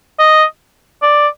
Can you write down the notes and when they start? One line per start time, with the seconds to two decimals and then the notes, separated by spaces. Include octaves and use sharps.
0.19 D#5
1.02 D5